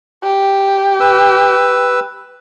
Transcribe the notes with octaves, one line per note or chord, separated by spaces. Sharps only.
G4
B4 E6